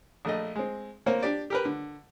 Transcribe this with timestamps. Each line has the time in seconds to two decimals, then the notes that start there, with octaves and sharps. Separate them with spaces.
0.25 A#1 A3 D#5
0.55 G#3 C4
1.06 A#3 C4 C5 C#5
1.22 D4 G4 D5
1.50 G4 A#4 B4
1.65 D3